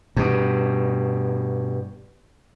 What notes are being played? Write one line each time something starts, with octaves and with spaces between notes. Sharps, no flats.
G2 B2